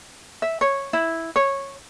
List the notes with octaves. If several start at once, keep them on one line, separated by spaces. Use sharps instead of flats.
E5
C#5
E4
C#5